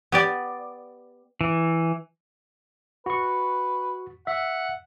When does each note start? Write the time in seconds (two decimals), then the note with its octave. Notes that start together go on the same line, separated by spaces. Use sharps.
0.12 B3 G4 D5
1.41 E3
3.06 F#4 B4 C#6
4.27 E5 F#5